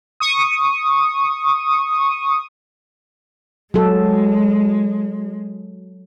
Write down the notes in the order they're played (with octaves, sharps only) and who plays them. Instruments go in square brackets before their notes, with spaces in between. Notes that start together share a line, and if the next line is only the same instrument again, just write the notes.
[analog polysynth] C#6 D#6
[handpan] F#3 A4 [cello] G#3